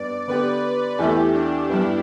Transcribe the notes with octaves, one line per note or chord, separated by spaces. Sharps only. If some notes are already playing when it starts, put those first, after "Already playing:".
Already playing: G2 G3 B3 D4 D5
D3 B3 G4 B4
E2 E3 A3 E4 G4
D4
G2 G3 B3 E4